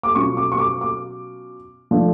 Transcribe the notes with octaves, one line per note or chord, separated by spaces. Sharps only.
D6
B2 F#3 C#4 F4 C#6
D6
C#6
D6
D6
F3 A3 D4